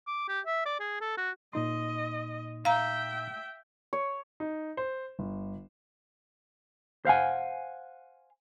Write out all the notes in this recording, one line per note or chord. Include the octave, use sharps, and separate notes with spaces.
D6
G4
E5
D5
G#4
A4
F#4
A#2 D#4 D#5 C6
E5 F5 G5 A#5
C#5
D#4
C5
G1
C5 F5 F#5 G#5